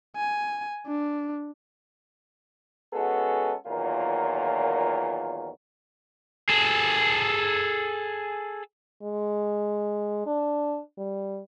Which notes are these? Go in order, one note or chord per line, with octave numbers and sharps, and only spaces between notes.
G#5
D4
G#3 B3 C#4 F#4 G#4 A4
E2 A#2 D#3 F#3 F4 A#4
G#4 A4
G#3
D4
G3